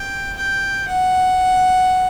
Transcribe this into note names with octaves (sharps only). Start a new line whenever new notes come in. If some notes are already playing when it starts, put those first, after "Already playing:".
Already playing: G5
G5
F#5